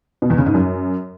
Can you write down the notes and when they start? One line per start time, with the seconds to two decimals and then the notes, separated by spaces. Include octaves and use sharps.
0.22 B2
0.30 E2
0.38 C#3
0.46 G#2
0.54 F#2